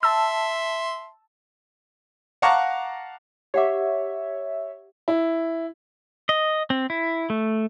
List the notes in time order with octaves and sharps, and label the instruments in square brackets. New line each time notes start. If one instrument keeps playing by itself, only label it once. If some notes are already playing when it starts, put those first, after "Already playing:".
[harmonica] E5 C6 [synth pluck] A5 E6
[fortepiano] F5 F#5 A5 A#5 C#6 D6
[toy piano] G4 F#5 D6 [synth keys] C#5 E5
[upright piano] E4
[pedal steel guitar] D#5
C4
E4
A3